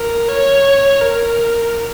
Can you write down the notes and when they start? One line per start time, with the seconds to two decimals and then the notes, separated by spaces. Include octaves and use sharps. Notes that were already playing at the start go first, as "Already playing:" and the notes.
Already playing: A#4
0.29 C#5
1.01 A#4